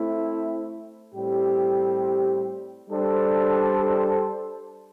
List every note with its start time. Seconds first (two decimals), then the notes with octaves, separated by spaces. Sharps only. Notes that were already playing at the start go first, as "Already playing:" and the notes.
Already playing: A3 C4 E4
1.14 A2 G3 C4 G4
2.88 G3 D4 A4 C5